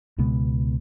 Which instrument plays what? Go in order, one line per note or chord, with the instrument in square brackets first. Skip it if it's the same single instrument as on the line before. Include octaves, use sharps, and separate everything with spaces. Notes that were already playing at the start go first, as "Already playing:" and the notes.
[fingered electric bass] C#2 B2 G#3 B3